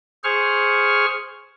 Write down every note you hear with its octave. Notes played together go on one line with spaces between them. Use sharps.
G#4 C5 C#6 F6